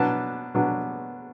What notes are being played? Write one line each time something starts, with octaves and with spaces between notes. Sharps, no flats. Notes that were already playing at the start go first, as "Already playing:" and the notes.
Already playing: B2 F#3 B3 D4 A5
B2 F#3 B3 D4